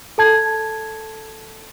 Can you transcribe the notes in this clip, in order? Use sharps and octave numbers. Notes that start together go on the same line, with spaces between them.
A4 A5 G#6